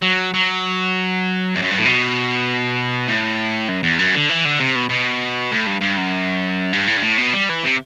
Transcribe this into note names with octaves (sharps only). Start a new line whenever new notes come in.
F#3
F#3
E2
F#2
G2
A2
B2
A2
F#2
E2
F#2
D3
E3
D3
C3
B2
B2
A2
G2
G2
F#2
G2
A2
G2
A2
B2
G3
E3
C3